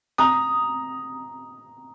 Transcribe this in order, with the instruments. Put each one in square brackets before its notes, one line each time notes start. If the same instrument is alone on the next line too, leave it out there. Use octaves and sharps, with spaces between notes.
[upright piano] A#5 D#6